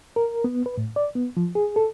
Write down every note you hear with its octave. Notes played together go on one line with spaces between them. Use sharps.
A#4
B3
B4
A2
D5
B3
F3
G#4
A4